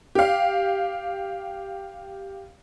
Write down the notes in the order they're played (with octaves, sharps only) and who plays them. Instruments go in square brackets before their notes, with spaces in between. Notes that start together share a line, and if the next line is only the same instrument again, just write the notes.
[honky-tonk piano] G4 F5